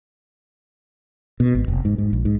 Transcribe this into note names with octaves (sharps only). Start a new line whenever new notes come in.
B2
G#1
F1
G#2
G#2
A#1
G#2